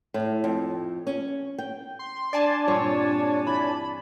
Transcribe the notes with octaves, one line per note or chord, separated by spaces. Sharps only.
A2
F2
C#4
G5
C6
D4 D5 G#5 A5
G2 A#2 C4 C#5
E3 B5